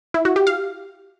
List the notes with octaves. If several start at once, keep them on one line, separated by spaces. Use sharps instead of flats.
E4
F#4
G4
F5